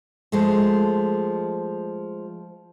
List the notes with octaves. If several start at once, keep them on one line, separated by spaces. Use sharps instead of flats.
F3 G#3 A3